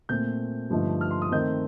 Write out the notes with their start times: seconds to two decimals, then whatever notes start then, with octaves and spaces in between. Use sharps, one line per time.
0.09 A#2 A3 C4 G6
0.70 G2 D3 F3 A3 D#4
1.01 F6
1.11 C6
1.22 D#6
1.32 D#3 A3 C4 D#4 G6